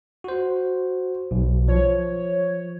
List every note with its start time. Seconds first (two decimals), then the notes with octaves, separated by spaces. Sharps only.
0.24 F#4 C5
1.31 B1
1.68 F3 C#5